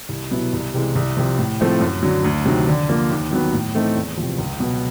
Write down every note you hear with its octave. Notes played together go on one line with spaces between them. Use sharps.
C2
B2 F#3 B3 E4
C2
C3 E3 G#3
C2
C3 F3
A2
F3 A3 C4 E4
F#2
D3 F#3
D2
C3 D#3 F#3
D3
F3 A#3
D#2
D#3 F#3 B3
A2
E3 A3 C4 D#4
E2
C3 F3
C#2
B2 F#3 B3